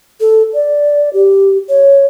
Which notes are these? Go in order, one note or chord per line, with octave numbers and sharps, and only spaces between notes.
A4
D5
G4
C#5